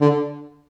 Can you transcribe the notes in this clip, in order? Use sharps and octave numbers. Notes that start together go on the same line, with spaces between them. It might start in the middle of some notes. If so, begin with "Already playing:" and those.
D3